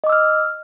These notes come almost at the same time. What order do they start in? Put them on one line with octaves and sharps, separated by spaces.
D#5 D6 E6 F6